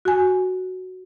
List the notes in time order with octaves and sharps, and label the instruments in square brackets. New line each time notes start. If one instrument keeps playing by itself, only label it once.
[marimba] F#4 G#5